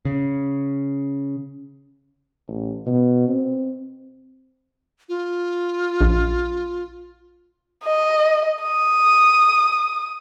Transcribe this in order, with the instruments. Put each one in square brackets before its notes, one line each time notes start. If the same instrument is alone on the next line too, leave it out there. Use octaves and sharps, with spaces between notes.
[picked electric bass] C#3
[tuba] A1
B2
C4
[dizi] F4
[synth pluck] A#1
[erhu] D#5
D#6